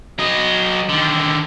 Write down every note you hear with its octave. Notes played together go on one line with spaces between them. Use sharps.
F#3 D#5
D3 D#3